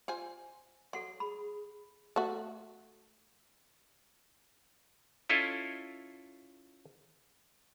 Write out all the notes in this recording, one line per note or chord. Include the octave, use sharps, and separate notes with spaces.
F4 C5 G#5
F#3 A4 F#5 C6
G#4 B5
A3 F#4
C#4 E4 F4 A4 D#5